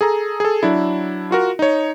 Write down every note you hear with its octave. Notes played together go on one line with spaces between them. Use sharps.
G#4 A4 A#5
G#4 A4
F#3 D4 E4
F4 F#4 A#4
D#4 C#5